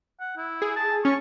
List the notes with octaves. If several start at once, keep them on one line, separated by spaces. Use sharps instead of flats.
F#5
E4
G#4
A5
C#4 C#6